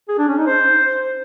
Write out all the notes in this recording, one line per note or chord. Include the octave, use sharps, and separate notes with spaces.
G#4
D4
C#4
D#4
C5